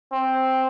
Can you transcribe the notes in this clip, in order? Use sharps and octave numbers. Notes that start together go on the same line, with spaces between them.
C4